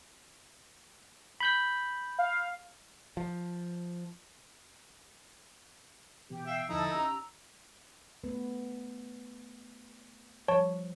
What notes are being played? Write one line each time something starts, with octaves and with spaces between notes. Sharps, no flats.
B5 G6 B6
F5
F3
B2 E3 B3 G4
E5 F5 G5
E2 D3 F3 D#4 E4 A4 A5 E6
C#4 G4 A#5 E6
A3 B3 B4
F3 G3 C#5 A5 C#6